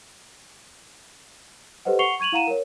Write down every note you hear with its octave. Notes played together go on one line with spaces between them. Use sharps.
G4 A4 B4 C5 D#5 F#5
F#5 C#6 C7 C#7 F7 G7
C#6 G#6 D#7 F7 F#7
E4 F5 F#5 A#5 D#7 E7
A#4 C#5